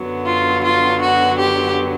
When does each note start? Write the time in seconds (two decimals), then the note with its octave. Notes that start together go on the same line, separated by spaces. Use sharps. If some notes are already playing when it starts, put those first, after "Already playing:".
Already playing: F#2 D3 F#3 B3
0.25 F4
0.64 F4
1.01 F#4
1.38 G4